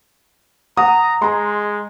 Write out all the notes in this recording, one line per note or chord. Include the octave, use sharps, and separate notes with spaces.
F#5 A#5 D#6
G#3 A#5 C6